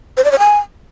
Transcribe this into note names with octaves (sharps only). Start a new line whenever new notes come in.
C5
D5
C#5
G#5